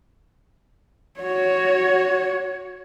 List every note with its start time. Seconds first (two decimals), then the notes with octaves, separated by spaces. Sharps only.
1.20 F#4 C#5